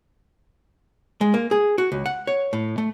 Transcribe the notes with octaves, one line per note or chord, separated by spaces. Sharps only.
G#3
A#3
G#4
F#4
C#2
F#5
C#5
A2
A3